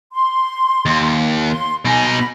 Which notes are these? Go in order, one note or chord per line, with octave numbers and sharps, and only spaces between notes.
C6
D#2
C6
B2 D#4 G#5
B5